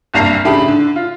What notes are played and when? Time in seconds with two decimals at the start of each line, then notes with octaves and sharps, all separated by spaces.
0.14 F#1 C2 G2 A#5 C7
0.45 C#3 A3 D4 G4 B5
0.68 D3
0.96 F4